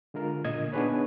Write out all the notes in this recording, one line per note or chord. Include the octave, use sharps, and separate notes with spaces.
D3 G#3 F4 A#4
A#2 D3 D#5 G#6
B3 D4 D#4 G#4 B4 C#5